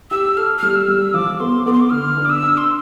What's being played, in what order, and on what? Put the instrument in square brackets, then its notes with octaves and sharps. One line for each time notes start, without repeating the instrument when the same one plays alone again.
[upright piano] G4 [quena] E6
[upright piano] A4 [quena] F6
[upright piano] G3 [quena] F6
[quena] E6
[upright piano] G3
[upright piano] F3 [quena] D6
[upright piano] B3 [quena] C6
[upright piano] B3 [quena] D6
[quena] C6
D6
[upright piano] D3 [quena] F6
[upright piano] D4
[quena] D6
E6
[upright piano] D4
[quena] C6